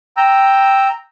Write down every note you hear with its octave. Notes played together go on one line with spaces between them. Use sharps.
G5 A#5 E6